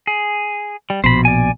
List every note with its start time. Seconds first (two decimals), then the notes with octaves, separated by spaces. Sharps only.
0.07 G#4
0.90 G3
1.04 A#1 B2 C5 B5
1.25 D5 G#5